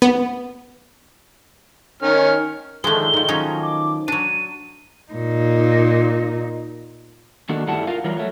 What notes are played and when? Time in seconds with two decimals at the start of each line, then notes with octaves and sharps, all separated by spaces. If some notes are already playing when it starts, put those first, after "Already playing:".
0.02 B3
2.02 D#3 C#4 F6
2.84 D3 D#3 F3 G#3 A3 G7
3.14 D#3 F3
3.28 F#3 C#4 D#4
3.62 D6
4.08 F#3 D4 D#7
5.13 A#2 D#4
7.49 D#3 A#3 D4 F#4 A4
7.67 G2 G3 A3 E4 F#5 A5
7.87 F4 A#4 F5
8.04 E3 F#3 G3 F4 A#4
8.17 F#3 A3